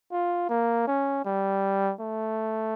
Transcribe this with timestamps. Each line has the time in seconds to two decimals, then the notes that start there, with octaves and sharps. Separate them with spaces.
0.12 F4
0.49 A#3
0.87 C#4
1.25 G3
2.00 A3